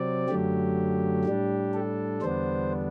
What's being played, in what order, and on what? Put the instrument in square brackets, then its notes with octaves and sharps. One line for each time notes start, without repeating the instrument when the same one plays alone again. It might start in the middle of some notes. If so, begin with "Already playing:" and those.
Already playing: [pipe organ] C3 F#3 C4 D5
F#2 D3 F#3 A3 G4
A2 G3 D4
A4
E2 D3 G3 B3 D4 C5